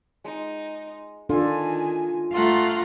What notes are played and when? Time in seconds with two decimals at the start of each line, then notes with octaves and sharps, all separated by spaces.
0.24 G#3 D#4
1.29 D#3 D4 F4 A4 G#5
2.33 A3 F4 F#5 A#5 C6